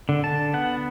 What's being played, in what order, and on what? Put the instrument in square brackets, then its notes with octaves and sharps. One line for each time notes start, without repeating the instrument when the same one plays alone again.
[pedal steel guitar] D3
A5
B3 F#5